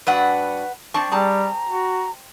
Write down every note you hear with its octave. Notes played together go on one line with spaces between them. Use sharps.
G2 D4 F#4 B4 F#5
C4 D4 A5 C#6
G3 C4 G#4 A5 A#5
F#4